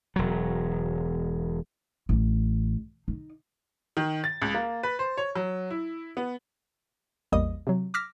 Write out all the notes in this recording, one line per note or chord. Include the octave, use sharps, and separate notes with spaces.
E1 F#3
A1
D#4
D#3
A6
C#2
A#3
B4
C5
C#5
F#3
E4
B3
A1 E2 G3 A#3 D#5 D#6
C3 F#3
D6 E6 F6 A#6 B6